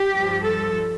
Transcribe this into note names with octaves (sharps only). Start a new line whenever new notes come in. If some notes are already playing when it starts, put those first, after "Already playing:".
Already playing: G4
G2 F3
A4